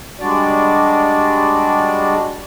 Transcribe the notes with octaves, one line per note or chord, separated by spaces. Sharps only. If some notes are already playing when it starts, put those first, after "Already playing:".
G3 G#3 D4 F#4 D5